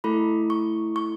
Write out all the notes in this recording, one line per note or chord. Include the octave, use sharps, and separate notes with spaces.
A3 E4 A4 B5
C#6
C#6